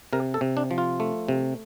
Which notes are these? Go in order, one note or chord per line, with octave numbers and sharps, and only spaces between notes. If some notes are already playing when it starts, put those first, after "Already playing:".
C3 A#4
A4
C3
D4
F3
F4
A3
C3